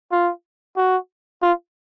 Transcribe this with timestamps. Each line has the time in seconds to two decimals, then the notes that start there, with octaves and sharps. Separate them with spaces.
0.12 F4
0.77 F#4
1.42 F4